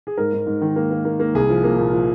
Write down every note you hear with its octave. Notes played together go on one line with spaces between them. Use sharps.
G#4
G#2 A#4
G#2
G#2
D#3
A#3
A#3
A#3
A#3
C2 G#4
F3
A#3
A#2
F3